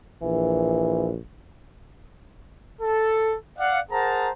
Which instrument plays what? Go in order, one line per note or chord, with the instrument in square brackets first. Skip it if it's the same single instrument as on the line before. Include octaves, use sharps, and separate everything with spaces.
[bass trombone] A#1 [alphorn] E3
[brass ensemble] A4
D5 F5 F#5
G#4 A#4 C5 F#5 A5 A#5